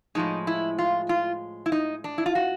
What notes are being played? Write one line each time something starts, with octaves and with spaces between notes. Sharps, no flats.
A2 F3 G#3 D#4
E4
F4
F4
E4
D#4
D4
E4
F4
F#4